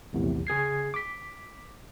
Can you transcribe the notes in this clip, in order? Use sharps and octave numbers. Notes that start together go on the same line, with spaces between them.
A#1 E2 A2 C3
C#3 G#4 G#6 C7
D6 B6